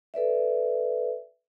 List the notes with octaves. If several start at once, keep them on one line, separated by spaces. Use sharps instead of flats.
A4 B4 D5 E5